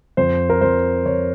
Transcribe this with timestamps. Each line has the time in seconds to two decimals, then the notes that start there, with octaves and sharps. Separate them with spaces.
0.17 F2 C5
0.50 A#4
0.61 F2 C5
1.06 F2 C#5